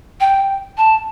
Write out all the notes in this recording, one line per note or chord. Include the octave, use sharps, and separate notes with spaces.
G5
A5